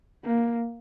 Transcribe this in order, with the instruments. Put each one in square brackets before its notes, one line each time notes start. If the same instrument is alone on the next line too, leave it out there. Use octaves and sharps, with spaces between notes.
[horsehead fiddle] A#3